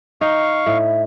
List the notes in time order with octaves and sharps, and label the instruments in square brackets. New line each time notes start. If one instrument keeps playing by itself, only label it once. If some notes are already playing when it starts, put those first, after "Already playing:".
[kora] D#4 [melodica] F5 C#6
[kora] A2 [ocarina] E5